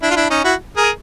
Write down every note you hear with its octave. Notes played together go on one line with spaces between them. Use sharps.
D4 E4
F4
D4 E4
C#4 D#4
E4 F#4
G#4 A#4